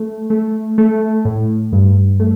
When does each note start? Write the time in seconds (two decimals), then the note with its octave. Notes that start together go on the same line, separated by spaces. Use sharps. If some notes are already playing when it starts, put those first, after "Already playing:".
Already playing: A3
0.30 A3
0.78 A3
1.25 A2
1.72 G2
2.20 A3